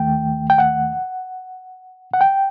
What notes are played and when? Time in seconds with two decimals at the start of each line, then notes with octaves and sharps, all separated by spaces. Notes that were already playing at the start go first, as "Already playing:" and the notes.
Already playing: D#2 D#3 A3 G5
0.50 G5
0.58 F#5
2.13 F#5
2.21 G5